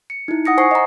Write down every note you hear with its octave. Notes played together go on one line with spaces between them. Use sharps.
C#7
D#4 E4
F#5 D#6 A#6 C#7
C5 G#5 C#6 C7
D#5 A#5